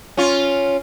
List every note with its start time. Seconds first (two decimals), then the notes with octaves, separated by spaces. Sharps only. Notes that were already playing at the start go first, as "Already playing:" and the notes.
0.17 C#4 F4